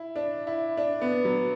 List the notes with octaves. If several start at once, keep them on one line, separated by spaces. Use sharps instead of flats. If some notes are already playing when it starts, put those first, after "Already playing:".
Already playing: E4
D4
E4
D4
B3
F#3